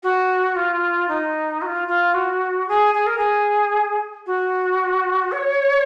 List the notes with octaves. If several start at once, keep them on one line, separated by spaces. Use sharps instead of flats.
F#4
F4
D#4
F#4
F4
F4
F#4
G#4
G#4
A#4
G#4
F#4
C#5